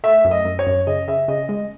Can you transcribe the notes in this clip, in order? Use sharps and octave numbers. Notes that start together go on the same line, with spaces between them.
A3 E5
F#2
D#5
F#2
C#5
F#2
C#3 D#5
C#3 E5
C#3 D#5
G#3 D#5